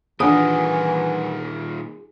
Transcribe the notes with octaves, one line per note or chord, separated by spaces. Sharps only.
A#2 D#3 E3 D4 G#4 F#5 D#6